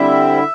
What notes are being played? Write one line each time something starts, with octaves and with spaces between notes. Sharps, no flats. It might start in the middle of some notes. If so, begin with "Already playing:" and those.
Already playing: D3 G3 C4 E4 E5